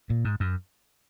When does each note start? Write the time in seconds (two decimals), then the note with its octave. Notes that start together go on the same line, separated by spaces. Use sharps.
0.10 A#2
0.25 G#2
0.40 F#2